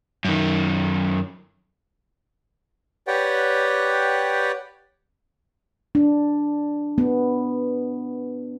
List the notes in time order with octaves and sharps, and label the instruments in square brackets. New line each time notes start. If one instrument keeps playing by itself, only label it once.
[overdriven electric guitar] F#2 D#3
[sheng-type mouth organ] G4 B4 C#5 D5 F#5 G5
[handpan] D4
B3